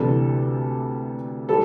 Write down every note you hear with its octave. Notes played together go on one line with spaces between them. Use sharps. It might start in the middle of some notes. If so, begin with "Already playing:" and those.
Already playing: D2 C3 E3 G3 A4
G3 A4